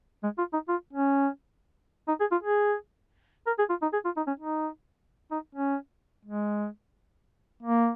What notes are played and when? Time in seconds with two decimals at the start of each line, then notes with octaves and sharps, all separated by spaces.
0.24 G#3
0.38 F4
0.53 D#4
0.69 F4
0.93 C#4
2.08 D#4
2.20 G#4
2.32 F4
2.43 G#4
3.47 A#4
3.59 G#4
3.70 F4
3.82 D#4
3.93 G#4
4.05 F4
4.17 D#4
4.27 C#4
4.40 D#4
5.31 D#4
5.55 C#4
6.25 G#3
7.63 A#3